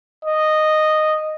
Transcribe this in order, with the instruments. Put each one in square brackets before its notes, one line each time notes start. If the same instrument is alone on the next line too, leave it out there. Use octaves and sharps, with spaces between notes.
[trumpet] D#5